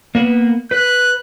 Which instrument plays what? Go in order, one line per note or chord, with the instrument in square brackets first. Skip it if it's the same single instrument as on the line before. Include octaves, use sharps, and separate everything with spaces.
[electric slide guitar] A#3 B3 B4
[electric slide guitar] B4 [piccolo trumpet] F#6